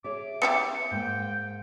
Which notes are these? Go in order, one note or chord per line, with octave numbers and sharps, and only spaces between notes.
G#4 C#5 E5 D6
B3 E4 G4 C#7
G#2 A#3 G5